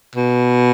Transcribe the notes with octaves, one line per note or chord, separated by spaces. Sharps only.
B2